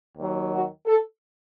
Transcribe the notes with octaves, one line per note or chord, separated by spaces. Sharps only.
D#2 D#3 F#3
F#4
A4